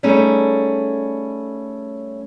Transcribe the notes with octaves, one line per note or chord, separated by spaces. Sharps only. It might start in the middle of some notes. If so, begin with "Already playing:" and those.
G3 A3 C#4 D#4 G#4 A4